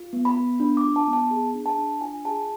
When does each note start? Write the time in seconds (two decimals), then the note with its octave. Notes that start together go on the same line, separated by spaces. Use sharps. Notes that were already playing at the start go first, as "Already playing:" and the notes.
Already playing: F4
0.13 B3
0.25 B5
0.36 B3
0.60 D4
0.77 D6
0.83 F4
0.96 A5
1.07 B3
1.13 A5
1.31 G#4
1.54 D4
1.66 A5
1.78 D4
2.01 F4 G#5
2.25 G#4 A5